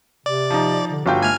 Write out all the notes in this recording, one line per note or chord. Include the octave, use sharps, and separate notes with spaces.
C3 D5
F3 D#4
D3
G1 F4 F#4 G5
A3 G#5 F6